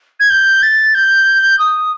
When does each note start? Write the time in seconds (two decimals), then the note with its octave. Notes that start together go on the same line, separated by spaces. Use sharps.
0.20 G#6
0.30 G6
0.62 A6
0.95 G6
1.59 D#6